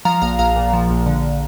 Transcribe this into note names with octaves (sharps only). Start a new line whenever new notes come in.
F3 F5 A#5
A#1 F5 A#5
A#1 F5 A#5
A#2
F3
A#1
D3